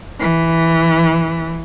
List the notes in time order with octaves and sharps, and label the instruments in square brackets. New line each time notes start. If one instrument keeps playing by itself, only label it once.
[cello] E3